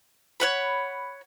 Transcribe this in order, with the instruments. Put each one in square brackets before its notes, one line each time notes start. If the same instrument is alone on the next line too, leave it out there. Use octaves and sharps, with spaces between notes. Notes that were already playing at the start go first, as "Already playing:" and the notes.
[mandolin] C#5 F#5 B5